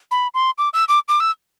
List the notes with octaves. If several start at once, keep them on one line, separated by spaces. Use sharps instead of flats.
B5
C6
D6
E6
D6
D6
E6